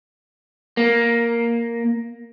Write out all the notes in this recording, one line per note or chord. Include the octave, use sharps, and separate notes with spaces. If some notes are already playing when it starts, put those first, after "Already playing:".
A#3